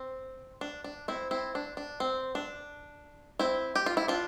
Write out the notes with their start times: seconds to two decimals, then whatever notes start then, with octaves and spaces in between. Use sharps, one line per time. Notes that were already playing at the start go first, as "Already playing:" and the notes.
Already playing: C4
0.61 D4
0.84 D4
1.08 C4 E4
1.31 C4 E4
1.55 D4
1.77 D4
2.00 C4
2.35 D4
3.39 C4 E4
3.75 G4
3.86 F4
3.97 E4
4.08 D4 F4